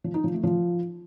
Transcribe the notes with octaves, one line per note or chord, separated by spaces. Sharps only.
F3
D#4
F3
A3
F3